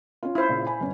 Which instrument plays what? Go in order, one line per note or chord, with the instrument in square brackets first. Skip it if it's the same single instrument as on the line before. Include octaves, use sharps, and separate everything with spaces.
[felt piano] C#4 F4
[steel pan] E4 C5
[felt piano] A#2 C#3
G#5 B5
G1 C#4